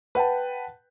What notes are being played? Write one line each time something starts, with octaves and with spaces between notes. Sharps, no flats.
B4 F#5 G5 A5